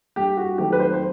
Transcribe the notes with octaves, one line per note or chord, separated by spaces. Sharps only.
G2 G4
F#4
D#3 F#3 A3 C4 G4
B4
C5
C5